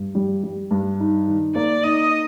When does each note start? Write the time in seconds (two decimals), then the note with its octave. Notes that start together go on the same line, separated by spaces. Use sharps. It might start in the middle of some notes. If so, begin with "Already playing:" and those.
Already playing: G2
0.15 G3
0.43 G3
0.71 G2
1.00 D#4
1.28 D#3
1.55 A#3 D5
1.84 D#4 D#5